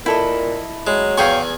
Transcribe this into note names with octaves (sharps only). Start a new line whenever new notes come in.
A#2 E4 A4 D#5
F#3 G#3
E2 G#4 F5 G5 G#5 C#6